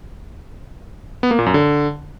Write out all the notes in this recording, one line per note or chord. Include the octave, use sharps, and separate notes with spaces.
B3
A#3
A#2
F#2
D3